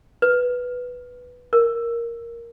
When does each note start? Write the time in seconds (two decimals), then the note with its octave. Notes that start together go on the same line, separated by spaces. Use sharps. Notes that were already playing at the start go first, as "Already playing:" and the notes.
0.22 B4
1.53 A#4